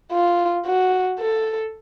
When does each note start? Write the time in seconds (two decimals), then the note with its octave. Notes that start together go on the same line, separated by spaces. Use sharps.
0.12 F4
0.66 F#4
1.19 A4